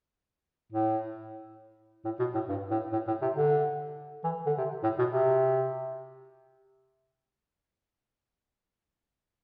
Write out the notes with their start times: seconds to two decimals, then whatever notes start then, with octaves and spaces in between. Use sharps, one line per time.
0.72 A2
2.05 A2
2.19 B2
2.34 A2
2.49 G2
2.71 A2
2.93 A2
3.07 A2
3.22 C3
3.36 D3
4.24 E3
4.46 D3
4.58 C3
4.83 A2
4.98 B2
5.13 C3